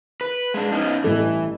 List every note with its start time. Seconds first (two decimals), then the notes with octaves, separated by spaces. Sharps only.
0.21 B4
0.54 G#3 D4
0.72 B3 C#4 D#4
1.04 A1 G2 E3 A4